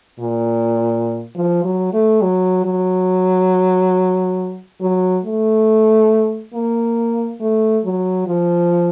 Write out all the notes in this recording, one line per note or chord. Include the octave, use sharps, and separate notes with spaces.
A#2
F3
F#3
A3
F#3
F#3
F#3
A3
A#3
A3
F#3
F3